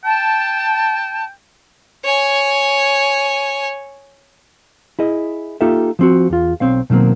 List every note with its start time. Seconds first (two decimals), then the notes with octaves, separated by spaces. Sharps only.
0.04 G5 A5
2.05 C#5 G#5
4.99 E4 G#4 D#5
5.61 A#3 D#4 F4 G4 A4 E5
5.99 F3 C4 F#4
6.30 E2 F4
6.60 B1 C4 C#5 F5
6.90 B2 D#3 F#3 A#3 C4